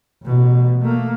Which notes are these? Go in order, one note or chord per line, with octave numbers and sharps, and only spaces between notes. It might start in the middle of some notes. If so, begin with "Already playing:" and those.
A1 B2
A3 A#3